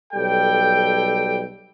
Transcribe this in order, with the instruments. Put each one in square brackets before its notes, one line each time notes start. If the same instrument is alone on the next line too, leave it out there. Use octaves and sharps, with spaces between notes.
[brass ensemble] B1 G3 A4 G5